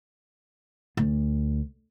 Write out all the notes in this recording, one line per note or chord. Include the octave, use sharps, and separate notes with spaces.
D2